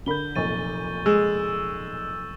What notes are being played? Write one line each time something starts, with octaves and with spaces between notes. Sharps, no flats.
D3 A#4 B5 G6 G7
F1 B1 A#2 C#6 A6 D#7
G#3 E6 E7